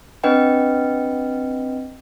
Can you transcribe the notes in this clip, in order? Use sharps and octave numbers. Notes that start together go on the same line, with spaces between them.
C4 D4 B4 D#5 F#5 G5